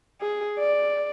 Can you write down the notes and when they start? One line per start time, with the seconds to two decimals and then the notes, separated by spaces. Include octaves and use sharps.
0.21 G#4
0.59 D5